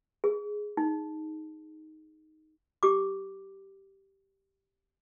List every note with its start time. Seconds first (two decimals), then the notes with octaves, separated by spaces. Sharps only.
0.24 G#4
0.77 D#4
2.83 G4 D6